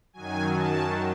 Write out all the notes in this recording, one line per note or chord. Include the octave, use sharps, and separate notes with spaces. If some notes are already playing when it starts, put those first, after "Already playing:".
F#2 D#3 F#3 G#5
A5